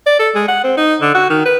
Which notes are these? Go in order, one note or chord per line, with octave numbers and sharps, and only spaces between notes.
D5
A4
G#3
F#5
C4
D#4
D3
F#4
D#3
B4